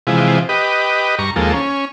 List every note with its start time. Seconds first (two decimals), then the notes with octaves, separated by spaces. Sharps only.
0.07 C3 E3 F3 G#3
0.49 G4 B4 D#5
1.19 G2 A#5 C#6
1.36 D#2 F3 G#3 A#3 A4
1.53 C#4